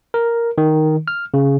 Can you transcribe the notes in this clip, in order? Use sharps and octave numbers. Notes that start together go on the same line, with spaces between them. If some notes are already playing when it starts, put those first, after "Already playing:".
A#4
D#3
F6
C#3